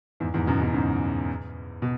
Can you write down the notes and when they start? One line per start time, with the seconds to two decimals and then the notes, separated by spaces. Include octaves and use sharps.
0.20 E2 G#2
0.34 E2 G#2
0.47 F#2 B2
0.61 F#2 B2
0.74 G#2 C#3
1.82 B2